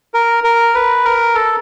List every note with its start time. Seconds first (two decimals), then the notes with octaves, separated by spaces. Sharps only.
0.14 A#4
0.44 A#4
0.75 B4
1.05 A#4
1.35 A4